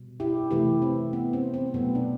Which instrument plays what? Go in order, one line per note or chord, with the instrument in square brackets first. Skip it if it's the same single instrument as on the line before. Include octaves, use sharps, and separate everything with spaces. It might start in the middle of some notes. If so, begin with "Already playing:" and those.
Already playing: [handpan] B2 G3
E4 G4
C3 E3 A3 E4 G4
C4
B3
C4
C4
B2 F#3 A3 B3
D4